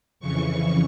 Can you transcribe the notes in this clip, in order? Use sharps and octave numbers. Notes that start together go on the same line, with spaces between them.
F2 C#3 E3 C#6